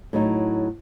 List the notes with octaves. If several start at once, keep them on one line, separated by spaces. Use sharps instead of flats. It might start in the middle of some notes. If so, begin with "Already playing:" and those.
A2 F#3 D#4